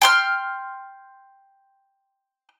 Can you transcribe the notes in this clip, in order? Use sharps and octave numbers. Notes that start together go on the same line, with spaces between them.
G5 C6 F6